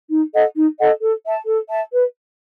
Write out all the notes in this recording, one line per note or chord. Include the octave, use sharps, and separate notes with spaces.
D#4
A4 D#5 F#5
D#4
A4 D#5 F#5
A4
E5 A5
A4
E5 A5
B4